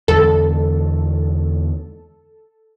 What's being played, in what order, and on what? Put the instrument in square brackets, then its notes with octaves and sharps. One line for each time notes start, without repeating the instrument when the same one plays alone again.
[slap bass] E2 D3 G#3 [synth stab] A4